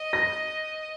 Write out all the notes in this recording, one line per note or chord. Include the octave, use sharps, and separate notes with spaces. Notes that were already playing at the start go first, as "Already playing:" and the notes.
Already playing: D#5
A#6